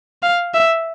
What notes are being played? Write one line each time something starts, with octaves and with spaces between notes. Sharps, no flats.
F5
E5